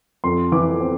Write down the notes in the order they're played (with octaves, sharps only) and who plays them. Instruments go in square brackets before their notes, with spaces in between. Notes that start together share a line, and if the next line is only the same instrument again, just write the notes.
[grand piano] F2 C6
E3 D6
C4